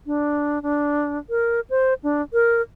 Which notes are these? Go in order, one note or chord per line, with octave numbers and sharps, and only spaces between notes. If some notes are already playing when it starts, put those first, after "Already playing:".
D4
D4
A#4
C5
D4
A#4